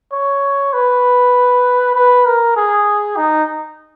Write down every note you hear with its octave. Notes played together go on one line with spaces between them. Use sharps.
C#5
B4
B4
A#4
G#4
D#4